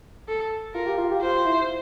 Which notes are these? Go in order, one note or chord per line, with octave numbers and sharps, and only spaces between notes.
A4
F4 A#4
G4
F4
G4
F4 C5
E4